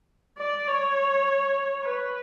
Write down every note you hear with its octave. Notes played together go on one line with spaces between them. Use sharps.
D5
C#5
B4